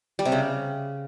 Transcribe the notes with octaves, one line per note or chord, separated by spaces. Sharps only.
G3
C3
C#3